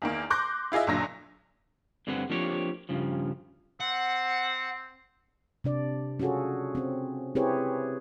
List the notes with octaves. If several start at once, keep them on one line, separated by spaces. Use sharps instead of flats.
E2 D#3 A#3
C6 D6 F#6 G6 A#6
E4 F4 G#4 D#5 E5
B1 A#2 D3 F#3 E6 A#6
G2 D3 C4 G#4 B4 F#5
F3 A#3 C4 D4 G4 C#5
G2 C#3 F3
C4 F#5
C3 D4 D5
C#4 F4 F#4 G#4 A4
C4 C#4
C4 E4 G4 G#4 B4 C#5